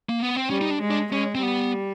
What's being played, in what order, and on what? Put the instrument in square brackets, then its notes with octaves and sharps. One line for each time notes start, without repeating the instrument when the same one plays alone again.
[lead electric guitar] A#3
B3
C4
[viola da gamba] G3 [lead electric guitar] C#4
[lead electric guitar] D#4
D4
[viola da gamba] G#3
[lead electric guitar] D4
[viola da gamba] G#3 [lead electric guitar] C#4
[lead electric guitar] C4
[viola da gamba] G3 [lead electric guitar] B3